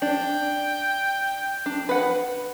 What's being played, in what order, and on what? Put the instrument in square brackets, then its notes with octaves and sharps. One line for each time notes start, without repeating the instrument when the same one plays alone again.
[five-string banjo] D4 [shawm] G5
[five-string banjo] D4
B4 F#5